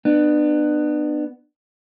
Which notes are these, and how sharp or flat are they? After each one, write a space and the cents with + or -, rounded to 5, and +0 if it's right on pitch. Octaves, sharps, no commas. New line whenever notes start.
B3 +5 D4 +35